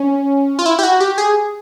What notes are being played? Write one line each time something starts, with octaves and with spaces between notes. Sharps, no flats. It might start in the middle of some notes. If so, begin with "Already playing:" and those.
Already playing: C#4
F4
E4
G4
F#4
G4
G#4